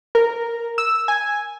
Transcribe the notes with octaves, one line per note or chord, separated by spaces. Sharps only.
A#4
E6
G#5